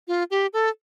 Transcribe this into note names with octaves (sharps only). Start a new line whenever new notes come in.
F4
G4
A4